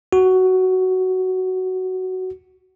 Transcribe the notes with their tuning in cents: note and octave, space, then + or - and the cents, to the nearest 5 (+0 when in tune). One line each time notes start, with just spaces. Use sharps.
F#4 +10